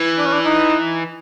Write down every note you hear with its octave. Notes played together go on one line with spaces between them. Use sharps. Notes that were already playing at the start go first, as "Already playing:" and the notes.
Already playing: E3
D4
C#4
D4
D#4